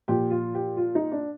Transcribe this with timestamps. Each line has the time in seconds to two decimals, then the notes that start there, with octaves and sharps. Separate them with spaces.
0.08 A#2 F3 G4
0.30 F4
0.54 G4
0.77 F4
0.95 D#4
1.12 D4